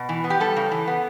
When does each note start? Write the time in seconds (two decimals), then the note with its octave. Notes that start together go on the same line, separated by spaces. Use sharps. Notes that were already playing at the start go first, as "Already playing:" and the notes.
Already playing: B2
0.09 E3
0.24 B3
0.30 G4
0.40 G3 A4
0.56 C#3
0.71 E3
0.87 B3